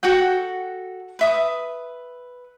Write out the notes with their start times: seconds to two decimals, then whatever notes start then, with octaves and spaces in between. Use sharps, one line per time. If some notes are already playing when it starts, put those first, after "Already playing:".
0.03 F#4 A4 F#5 G5
1.19 B4 E5 D#6